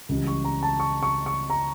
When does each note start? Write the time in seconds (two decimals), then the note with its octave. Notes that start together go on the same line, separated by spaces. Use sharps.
0.09 C#2 C#3 E3 G3
0.27 C#6
0.45 A#5
0.63 A5
0.80 C#6
1.03 C#6
1.26 C#6
1.50 A#5